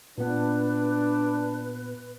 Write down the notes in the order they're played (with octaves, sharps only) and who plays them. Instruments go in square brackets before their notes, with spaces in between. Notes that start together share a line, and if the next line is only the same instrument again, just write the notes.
[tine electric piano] A#2 B3 [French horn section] D4 [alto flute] B4